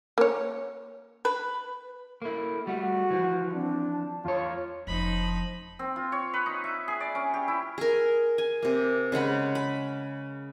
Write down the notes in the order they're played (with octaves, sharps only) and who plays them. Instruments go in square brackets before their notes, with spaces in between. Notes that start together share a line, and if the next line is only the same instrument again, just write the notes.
[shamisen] A#3 C#5
[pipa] B4
[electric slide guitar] A#3 E4 [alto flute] A4
[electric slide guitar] G3 A3 [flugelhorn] F#4 [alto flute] F#5
[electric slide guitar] E3 F3
[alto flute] C4 [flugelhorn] D4
[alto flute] A5
[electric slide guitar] E2 C#5 [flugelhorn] F4
[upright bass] F1 C#3 [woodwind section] F3 [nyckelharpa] D#4 B5
[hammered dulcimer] C4
F4
C#5
B4
D#4
E5
G#4
D5
C#4
G4
E4
[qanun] G#4 A#4
G#5
C3 A#3
C#3 G#3 F#5 B5
B5